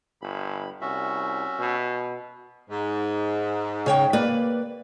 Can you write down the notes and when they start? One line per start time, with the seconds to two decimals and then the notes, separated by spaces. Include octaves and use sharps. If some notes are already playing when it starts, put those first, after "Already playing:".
0.22 G1 B5
0.81 C2 C#4 F#4 E5
1.59 B2
2.70 G#2
3.86 C#3 C#5 G5
4.13 A#3 B4 D5